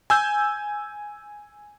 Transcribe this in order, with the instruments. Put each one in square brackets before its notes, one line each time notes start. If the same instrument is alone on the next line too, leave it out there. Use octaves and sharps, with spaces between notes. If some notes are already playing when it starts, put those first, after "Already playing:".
[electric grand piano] G#5 E6 G6